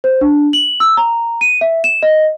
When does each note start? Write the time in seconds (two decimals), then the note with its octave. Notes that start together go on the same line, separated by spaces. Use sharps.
0.04 C5
0.21 D4
0.53 F#7
0.80 E6
0.97 A#5
1.41 D#7
1.61 E5
1.84 E7
2.03 D#5